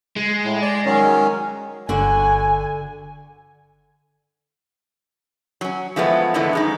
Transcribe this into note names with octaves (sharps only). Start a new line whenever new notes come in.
G#3
A2
D5
D#3 F#3 C#4
G1 D3 F#4 G#5
F#3 C#4
E3 F3 G#3 A3 B3
A2 D3 E3 G#3 B3
F#2 G#3 D#4